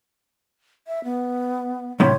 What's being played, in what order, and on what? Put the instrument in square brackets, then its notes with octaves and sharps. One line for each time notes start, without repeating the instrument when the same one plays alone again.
[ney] E5
B3
[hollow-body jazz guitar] F#2 A2 C3 [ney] C#5